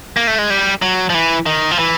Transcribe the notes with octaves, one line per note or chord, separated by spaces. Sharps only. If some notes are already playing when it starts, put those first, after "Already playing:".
A#3
A3
G#3
G3
F#3
F3
E3
D#3
F3
E3